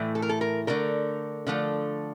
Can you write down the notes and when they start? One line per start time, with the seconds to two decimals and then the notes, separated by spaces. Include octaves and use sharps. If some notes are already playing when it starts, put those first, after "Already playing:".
Already playing: A2 E3 A3
0.15 A4
0.22 A#4
0.29 A4
0.41 A#4
0.67 D3 A3 A#4
1.47 D3 F3 A3